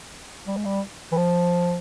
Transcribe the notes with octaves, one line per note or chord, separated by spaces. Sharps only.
G3
G#3
G3
E3
F3